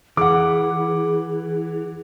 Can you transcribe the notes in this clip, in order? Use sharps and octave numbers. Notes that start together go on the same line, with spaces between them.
E3 G#4 F#5 D6